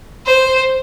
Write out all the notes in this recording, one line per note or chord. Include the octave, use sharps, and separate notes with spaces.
C5